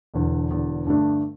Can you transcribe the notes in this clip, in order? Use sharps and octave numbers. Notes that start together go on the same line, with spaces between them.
E1 E2 D3
E1 E2 D3
G2 D3 A3 D4